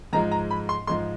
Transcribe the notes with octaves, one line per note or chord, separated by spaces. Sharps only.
G#2 F3 G#3 A#5
A#5
B5
C6
G#2 F3 G#3 C6